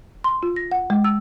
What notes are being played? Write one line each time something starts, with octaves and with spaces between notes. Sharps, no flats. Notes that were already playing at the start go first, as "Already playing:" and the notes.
C6
F4
A#6
F#5
G#3
E6